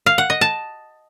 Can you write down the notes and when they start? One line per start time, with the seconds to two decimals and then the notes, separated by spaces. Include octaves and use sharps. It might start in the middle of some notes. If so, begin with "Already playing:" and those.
0.06 F5
0.18 F#5
0.30 D#5
0.41 A5